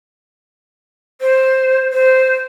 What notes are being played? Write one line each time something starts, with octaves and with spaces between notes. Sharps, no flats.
C5
C5